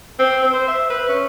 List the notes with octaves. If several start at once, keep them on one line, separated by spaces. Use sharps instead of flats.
C4
C4
C5
E5
B4
C#4